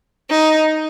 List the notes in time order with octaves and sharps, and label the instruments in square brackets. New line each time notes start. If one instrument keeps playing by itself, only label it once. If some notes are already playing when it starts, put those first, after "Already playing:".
[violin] D#4